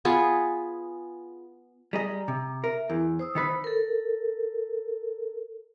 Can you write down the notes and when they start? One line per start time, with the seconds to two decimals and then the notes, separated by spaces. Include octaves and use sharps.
0.05 B3 F4 G#4 B4
1.93 G3 G#4 D#5 A#5
2.28 C3
2.64 A#4 E5
2.90 E2 E4
3.19 C5 D#6 E6
3.35 D#3 D#4 B4
3.64 A4 A#4